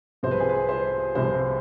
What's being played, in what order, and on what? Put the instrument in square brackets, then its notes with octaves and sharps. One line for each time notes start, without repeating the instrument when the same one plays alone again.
[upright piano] C2 C3 F3 C4 C5
B4
G#4
B4
C5
C2 C3 F3 C4 C5